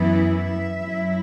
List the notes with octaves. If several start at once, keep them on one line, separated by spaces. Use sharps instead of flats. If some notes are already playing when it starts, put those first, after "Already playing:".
Already playing: F#2 E3 B3 E4
E5
F#2 F#3 E4